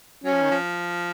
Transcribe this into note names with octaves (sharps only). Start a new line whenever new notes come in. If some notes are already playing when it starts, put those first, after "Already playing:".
F#3 C#4
F3
D#3
F3